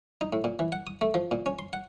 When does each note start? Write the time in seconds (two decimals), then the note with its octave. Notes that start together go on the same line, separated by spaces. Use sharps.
0.21 D#4
0.33 A2
0.44 A#2
0.59 E3
0.72 F#5
0.87 D#6
1.01 A3
1.14 F3
1.31 A#2
1.46 C#4
1.59 C6
1.73 F#5